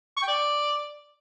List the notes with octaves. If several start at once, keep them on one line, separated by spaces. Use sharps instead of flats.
C#6
G5
D5